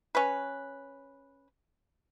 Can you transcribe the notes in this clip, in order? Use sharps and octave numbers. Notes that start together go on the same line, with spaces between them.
C#4 B4